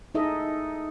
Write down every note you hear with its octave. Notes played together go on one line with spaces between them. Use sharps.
D#4 G#4 A4 D#5 E5